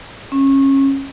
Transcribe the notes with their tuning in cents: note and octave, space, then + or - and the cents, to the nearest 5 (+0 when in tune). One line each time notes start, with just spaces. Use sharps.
C#4 -25